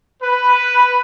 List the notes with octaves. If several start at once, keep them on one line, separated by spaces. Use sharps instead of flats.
B4